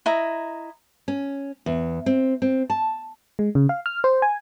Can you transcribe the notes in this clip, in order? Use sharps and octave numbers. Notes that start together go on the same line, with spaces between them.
E4 D#5 A#5
C#4
E2
C4
C4
A5
G#3
C#3
F5
F6
C5
G#5